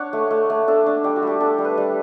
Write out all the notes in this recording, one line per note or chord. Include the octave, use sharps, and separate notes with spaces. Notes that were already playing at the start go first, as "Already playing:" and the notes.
Already playing: D4 C#5 F#5
A3
A3
A3
D4 A4
D4
G3 G4
F#4
G3 G4
D4 A4
G3
B4
G3